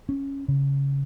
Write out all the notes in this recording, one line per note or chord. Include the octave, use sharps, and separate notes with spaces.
C#4
C#3